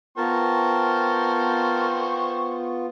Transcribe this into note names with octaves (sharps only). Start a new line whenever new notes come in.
B3 F4 A#4 C5 G5 A5 C#6